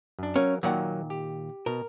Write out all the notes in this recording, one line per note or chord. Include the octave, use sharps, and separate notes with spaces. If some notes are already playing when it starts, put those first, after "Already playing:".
F#2 D4
F#3 C#4 A#4 F5
A#2 D#3 F#3 A#3 F#5
G4
B2 A#4